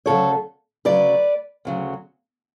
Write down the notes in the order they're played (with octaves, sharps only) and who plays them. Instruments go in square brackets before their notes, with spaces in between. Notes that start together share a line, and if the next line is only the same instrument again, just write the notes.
[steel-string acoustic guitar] D2 C#3 F#3 A4 C#5
D2 C#3 F#3 B4 D5
D2 C#3 F#3